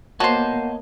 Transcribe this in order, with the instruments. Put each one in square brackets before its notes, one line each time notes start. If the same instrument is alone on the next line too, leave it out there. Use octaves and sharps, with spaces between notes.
[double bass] A#3 B3 [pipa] F#4 C5 [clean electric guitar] C#5 D#5 A5